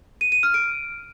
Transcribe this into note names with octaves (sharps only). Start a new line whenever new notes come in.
D#7
D#7
F6
D7